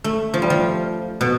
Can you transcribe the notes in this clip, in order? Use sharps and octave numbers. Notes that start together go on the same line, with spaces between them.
A3
F3
G3
F3
B2